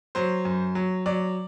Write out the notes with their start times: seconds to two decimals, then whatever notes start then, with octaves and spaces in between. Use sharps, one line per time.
0.15 F#3 C5
0.45 F#2
0.75 F#3
1.06 F#3 D5